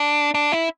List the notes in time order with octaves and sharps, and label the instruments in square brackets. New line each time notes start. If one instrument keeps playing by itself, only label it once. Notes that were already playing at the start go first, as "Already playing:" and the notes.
Already playing: [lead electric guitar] D4
D4
E4